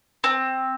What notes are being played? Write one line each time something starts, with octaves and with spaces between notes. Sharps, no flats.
C4